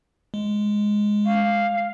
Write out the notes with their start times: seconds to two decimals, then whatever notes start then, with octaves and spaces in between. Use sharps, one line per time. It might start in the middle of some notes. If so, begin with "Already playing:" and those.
0.34 G#3
1.25 F5